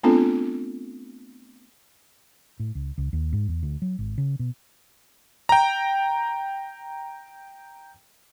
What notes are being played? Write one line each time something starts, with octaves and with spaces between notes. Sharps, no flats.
A3 B3 C4 D4 F4 A4
A2
C#2
C#2
D#2
G#2
E2
D2
F#3
G#1
C#3
B2
G5 A#5